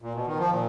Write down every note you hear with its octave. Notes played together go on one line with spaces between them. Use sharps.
A#2
B2
D#3
F3
A#2